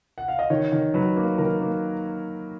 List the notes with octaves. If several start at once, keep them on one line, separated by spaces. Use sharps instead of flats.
F#5
F5
D#5
D#3 C#5
D#3
F#3 B4
A#3
D#3 A#4
A#3